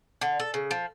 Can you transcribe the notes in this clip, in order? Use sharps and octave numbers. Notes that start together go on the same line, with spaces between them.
D3
A4
C#3
F3